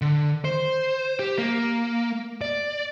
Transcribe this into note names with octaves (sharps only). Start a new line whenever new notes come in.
D3
C5
G4
A#3
D5